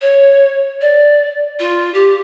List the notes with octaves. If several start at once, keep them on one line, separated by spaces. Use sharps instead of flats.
C#5
D5
F4
G4